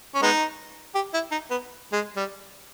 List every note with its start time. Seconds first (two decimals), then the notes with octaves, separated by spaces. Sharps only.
0.14 C#4
0.22 G#3 B3 D#4
0.95 G4
1.13 E4
1.31 D#4
1.50 B3
1.92 G#3
2.16 G3